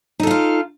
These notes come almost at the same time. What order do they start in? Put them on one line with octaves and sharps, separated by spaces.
D#4 A4 F5 F4